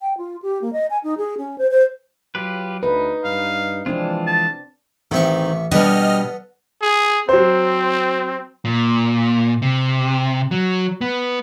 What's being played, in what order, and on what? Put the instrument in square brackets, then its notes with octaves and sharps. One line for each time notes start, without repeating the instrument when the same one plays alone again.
[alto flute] G5
F4
G4
A#3
D#5
G#5
D#4
G#4
C#4
C5
C5
[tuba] F#3 [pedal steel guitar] F4 G4 B4
[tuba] D2 [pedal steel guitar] D#4 [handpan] B4
[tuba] G2 [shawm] F5
[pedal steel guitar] E3 G#3 F4 [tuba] F3 [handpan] C4 D4
[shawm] A5
[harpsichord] A1 E4 C#6 [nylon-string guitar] D#3 C4
[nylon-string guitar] B2 D4 [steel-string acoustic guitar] G3 [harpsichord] B3 A4 [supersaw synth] D#5 F6
[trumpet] G#4
[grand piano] F#3 C5 [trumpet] C4
[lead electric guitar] A#2
C3
F#3
B3